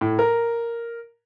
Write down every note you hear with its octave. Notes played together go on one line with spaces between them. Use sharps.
A2
A#4